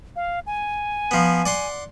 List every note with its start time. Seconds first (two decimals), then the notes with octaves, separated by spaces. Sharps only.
0.16 F5
0.46 G#5
1.11 F3 B3
1.46 D5 F#5 C6